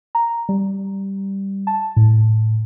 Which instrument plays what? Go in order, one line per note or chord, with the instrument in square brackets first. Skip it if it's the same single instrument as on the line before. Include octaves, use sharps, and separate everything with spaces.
[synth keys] A#5
G3
A5
A2